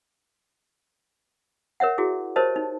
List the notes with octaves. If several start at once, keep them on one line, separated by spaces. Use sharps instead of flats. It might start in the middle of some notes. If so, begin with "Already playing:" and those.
A#4 C#5 E5 F#5
E4 F#4 G#4
G4 A#4 C5 C#5 D#5 A5
D#4